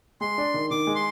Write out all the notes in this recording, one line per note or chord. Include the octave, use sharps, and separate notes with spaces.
G#3 C6
D4
D#3
D#3 D6
G#3
C6